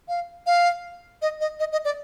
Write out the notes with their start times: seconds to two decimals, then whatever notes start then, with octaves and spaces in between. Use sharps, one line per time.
0.08 F5
0.47 F5
1.22 D#5
1.41 D#5
1.60 D#5
1.72 D#5
1.85 D5